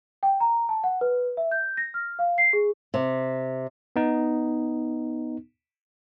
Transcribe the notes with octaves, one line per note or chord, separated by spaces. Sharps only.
G5
A#5
A5
F#5
B4
E5
G6
A#6
F6
F5
C7
G#4
C3
B3 D#4